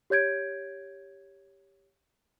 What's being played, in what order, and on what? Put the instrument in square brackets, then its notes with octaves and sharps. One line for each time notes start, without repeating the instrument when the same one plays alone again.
[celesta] G4 C#5 G6 G#6 D7